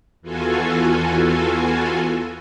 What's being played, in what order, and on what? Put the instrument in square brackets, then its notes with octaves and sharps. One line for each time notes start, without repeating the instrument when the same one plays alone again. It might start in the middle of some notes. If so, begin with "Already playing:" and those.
[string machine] E2 E3 F4 F#4 A4 G#5